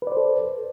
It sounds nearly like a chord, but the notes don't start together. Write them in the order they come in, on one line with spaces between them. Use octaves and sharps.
B4 D5 C5 A4